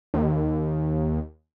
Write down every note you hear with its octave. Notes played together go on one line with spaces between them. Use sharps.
D#2